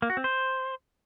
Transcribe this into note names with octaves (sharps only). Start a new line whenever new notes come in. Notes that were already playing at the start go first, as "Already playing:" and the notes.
A#3
F#4
C4
C5